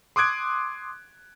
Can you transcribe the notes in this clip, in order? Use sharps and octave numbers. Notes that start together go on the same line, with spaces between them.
C6 D6 D#6 F#6 G#6 D7